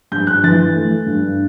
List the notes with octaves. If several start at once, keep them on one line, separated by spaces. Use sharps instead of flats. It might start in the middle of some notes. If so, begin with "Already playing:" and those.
G2 G6
F#6
E3 A6
A3
G2